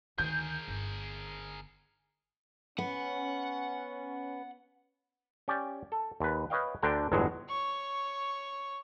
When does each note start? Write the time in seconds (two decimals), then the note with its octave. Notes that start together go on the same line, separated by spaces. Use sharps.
0.18 D2 D#3 G#4 A#4 G6
0.68 G1
2.78 B3 C#4 F#5
5.48 C#4 G4 D5
5.92 A4
6.20 D#2 B4
6.50 B4 C#5 D#5 F5 G5
6.82 D2 D3 D4 G5 A#5
7.12 G1 E2 A2 F#3 G#3
7.49 C#5 C#6